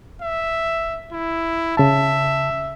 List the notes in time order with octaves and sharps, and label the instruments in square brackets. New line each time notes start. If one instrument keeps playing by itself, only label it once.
[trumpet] E5
E4
[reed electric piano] C#3 A5 [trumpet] E5